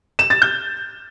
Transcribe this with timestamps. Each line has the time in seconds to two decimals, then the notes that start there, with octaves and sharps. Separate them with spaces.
0.19 E7
0.30 A6
0.42 G6